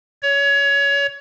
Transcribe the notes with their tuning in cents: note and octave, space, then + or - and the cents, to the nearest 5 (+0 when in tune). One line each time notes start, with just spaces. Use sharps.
C#5 +25